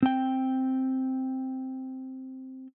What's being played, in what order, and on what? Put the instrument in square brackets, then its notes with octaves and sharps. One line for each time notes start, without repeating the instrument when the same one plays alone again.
[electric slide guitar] C4 G5